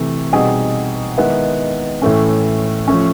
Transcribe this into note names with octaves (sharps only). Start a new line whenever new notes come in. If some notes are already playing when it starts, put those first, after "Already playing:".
Already playing: C3 E3 A3
B2 G3 C4 D#4 G#4
D#3 G#3 B3 E4
A2 E3 A3 C#4
F3 A3 C#4